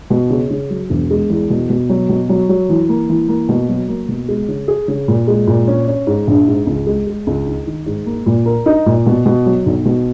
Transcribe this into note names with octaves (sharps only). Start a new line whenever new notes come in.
B2
C#3
C#3
F#3
E1
G#3
E2
B2
B2
F#3
B2
F#3
F#3
E3
A#3
E3
A#3
B2
F#3
A#3
B2
G#3
C#3
G#4
C#3
A#2
G#3
A#2
C#4
C#4
G#2
A#1
G#2
C#2
G#3
G#3
C#2
D#4
D#3
G#2
A#3
A#2
A#4
D#4
A#2
B2
B2
F#3
B1
B2